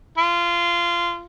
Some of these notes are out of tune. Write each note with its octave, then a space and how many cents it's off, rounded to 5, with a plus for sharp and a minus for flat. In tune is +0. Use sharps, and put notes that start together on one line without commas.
F4 -20